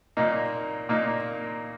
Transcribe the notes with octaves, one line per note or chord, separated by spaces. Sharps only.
A#2 A#3 D#4
A#2 A#3 D#4